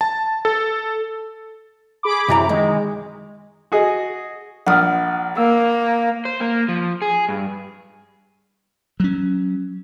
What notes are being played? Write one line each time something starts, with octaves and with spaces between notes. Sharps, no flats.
A5
A4
G#4 B5 D6
F#2 C3 E3 A#5
D#3 G#3
F#4 G#4 D#5
A#1 F#5 D#6 F6
A#3 E6
C5
A#3
F3
G#4
G2
F#3 C#4